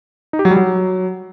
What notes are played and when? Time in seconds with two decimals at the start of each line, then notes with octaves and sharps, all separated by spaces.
0.33 D#4
0.39 G4
0.45 F#3
0.51 G3
0.57 F#3